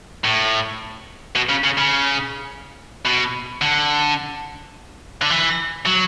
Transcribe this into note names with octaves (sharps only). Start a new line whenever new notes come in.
A2
B2
C#3
C#3
C#3
B2
D3
D3
E3
F#3